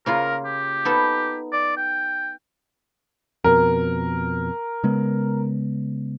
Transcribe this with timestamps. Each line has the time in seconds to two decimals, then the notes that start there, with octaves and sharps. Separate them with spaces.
0.06 C#3 A#3 F4 A#4
0.45 G4
0.85 B3 D#4 A4
1.52 D5
1.77 G5
3.44 F2 B2 A#4
4.84 C#3 G#3 B3